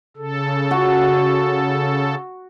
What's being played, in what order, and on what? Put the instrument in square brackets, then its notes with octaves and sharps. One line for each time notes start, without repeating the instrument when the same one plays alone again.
[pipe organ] C#3 A4
[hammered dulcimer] F#4